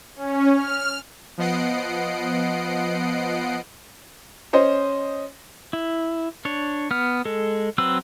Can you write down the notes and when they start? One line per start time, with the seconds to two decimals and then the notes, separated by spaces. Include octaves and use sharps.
0.16 C#4
0.53 F6
1.38 F3 B3 D#5 F#5 C7 D7
4.53 C#4 C5 D#5
5.73 E4
6.45 D4 C#5
6.91 B3 F6
7.25 G#3 A4
7.78 F#3 C4 B4 E6